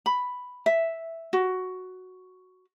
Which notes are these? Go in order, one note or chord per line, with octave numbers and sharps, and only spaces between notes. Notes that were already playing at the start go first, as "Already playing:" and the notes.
B5
E5
F#4